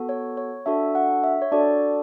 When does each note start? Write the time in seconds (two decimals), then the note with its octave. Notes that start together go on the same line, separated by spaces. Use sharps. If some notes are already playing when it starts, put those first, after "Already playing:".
Already playing: B3 F#4 A4
0.09 C#5
0.37 C#5
0.66 D4 F#4 A4 E5
0.95 F#5
1.24 E5
1.42 C#5
1.52 D4 F#4 A4 D5